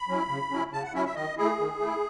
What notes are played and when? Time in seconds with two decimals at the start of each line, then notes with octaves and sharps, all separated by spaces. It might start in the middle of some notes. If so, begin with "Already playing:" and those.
Already playing: B5
0.08 F#3 C#4 E4
0.29 C#3
0.51 F#3 C#4 E4
0.73 C#3 A5
0.83 F#5
0.94 F#3 C#4 E4 E5
1.05 E5
1.15 D#3 D#5
1.37 A3 E4 G#4
1.59 D#3
1.80 A3 E4